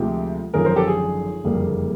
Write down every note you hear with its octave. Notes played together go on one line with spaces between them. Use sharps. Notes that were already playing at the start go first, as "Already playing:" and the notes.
Already playing: D2 C3 F3 G#3 G4
G#1 F#2 D3 F3 G#4 A#4
A#4 C5
G4 A4
G#4
F#1 F2 D3 G3 A#3